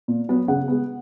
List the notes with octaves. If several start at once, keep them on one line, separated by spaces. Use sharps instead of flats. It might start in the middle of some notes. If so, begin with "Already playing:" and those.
A#2
F#3 B3
C#3 F#5
G#3 B3